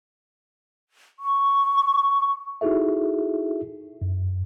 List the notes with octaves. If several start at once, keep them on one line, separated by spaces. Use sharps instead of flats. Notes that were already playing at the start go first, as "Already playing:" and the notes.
C#6
D#4 E4 F#4 G#4 A4 E5
F#2